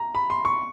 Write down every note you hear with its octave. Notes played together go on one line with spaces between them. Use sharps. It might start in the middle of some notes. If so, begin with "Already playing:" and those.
Already playing: A#5
B5
C6
C#6